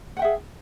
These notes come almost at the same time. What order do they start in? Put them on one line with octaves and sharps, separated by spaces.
F#5 G5 E5 G#4